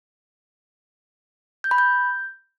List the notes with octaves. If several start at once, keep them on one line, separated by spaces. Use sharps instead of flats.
G6
B5
G6